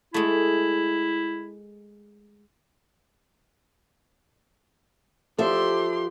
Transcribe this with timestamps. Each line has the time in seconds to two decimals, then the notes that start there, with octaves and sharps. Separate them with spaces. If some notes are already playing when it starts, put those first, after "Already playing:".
0.14 G#3 A3 E4
5.38 F3 G4 A4 E5 C6